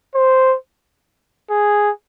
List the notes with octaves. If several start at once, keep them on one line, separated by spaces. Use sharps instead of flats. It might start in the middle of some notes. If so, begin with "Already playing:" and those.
C5
G#4